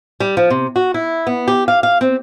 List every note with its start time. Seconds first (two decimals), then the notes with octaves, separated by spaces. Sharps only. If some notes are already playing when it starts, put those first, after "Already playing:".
0.20 G3
0.37 F3
0.50 C3
0.76 F#4
0.94 E4
1.27 B3
1.48 G4
1.68 F5
1.83 F5
2.01 C4